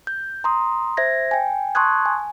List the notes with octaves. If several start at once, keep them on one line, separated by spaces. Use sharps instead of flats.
G6
A#5 C6 D#6
C5 E5 G#6 A#6
G5 G#5
A5 C6 C#6 D#6 F#6 G#6
G#5